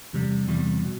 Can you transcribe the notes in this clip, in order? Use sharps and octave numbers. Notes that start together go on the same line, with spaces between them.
E2 C3 G3
E2 C3 G3
B2